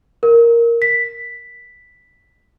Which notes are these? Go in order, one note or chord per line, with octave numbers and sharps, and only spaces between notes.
A#4
B6